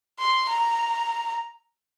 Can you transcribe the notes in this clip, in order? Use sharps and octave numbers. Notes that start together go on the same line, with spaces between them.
C6
A#5